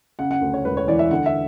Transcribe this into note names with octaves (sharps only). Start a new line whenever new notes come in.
C#3 F#5
F#5
D2
C#5
E1 B4
C#5
E3 D5
E5
D3 F#5
E5